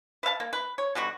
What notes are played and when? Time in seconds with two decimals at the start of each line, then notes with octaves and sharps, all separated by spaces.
0.23 B4 E5 F5 A5
0.40 A#3
0.53 B4
0.78 C#5
0.95 B2 D3 G3 F#4